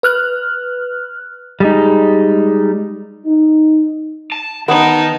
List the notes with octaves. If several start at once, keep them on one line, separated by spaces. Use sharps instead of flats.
B4 F6 F#6
G3 G#3 D#4
D#4
A5
D#3 B3 D#4 A5